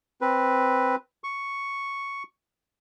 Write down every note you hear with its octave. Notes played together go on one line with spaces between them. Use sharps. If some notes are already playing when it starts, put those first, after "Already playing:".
C4 B4
C#6